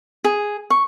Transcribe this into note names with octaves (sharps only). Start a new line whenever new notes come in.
G#4
C#6